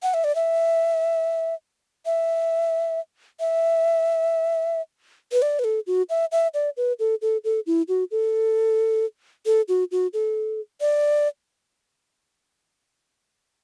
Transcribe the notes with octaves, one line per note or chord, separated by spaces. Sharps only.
F#5
E5
D5
E5
E5
E5
B4
D5
B4
A4
F#4
E5
E5
D5
B4
A4
A4
A4
E4
F#4
A4
A4
F#4
F#4
A4
D5